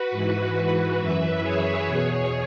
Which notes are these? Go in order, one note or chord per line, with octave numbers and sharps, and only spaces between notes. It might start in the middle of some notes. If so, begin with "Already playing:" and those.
Already playing: F#4 B4
G#2 E3
F#2 E3 B4 E5
G#4 C#5
E2 B2